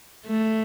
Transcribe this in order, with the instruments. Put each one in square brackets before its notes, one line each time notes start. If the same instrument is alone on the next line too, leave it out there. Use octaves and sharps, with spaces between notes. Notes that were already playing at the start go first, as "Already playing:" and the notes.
[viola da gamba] A3